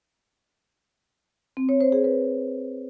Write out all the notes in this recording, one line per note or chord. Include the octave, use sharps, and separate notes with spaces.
C4
C#5
C5
G#4
B4